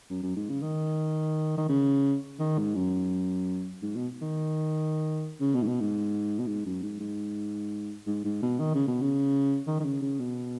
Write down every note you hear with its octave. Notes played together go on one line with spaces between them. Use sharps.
F#2
F#2
G#2
C#3
D#3
D#3
C#3
D#3
G#2
F#2
G#2
B2
D#3
C#3
B2
G#2
B2
G#2
B2
G#2
F#2
G#2
G#2
G#2
G#2
B2
D#3
C#3
B2
C#3
D#3
D#3
C#3
C#3
B2